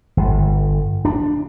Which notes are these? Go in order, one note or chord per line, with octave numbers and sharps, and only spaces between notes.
G1
D4